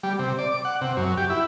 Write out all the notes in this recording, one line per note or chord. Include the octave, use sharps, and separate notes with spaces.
G3
C3
D5
D6
F#5
C3
F#2
G4
E4